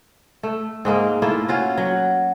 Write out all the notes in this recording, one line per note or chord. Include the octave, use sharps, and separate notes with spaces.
A3
G#2 G#3 A#3 D#4
A3 A#3 E4 F4
C#4 F4 F#4
F#3